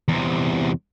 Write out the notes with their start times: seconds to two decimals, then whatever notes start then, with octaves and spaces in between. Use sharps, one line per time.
0.08 E2 C3